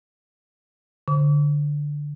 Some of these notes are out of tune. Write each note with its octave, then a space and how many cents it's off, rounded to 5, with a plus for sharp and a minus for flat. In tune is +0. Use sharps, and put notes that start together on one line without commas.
D3 +0 D6 -45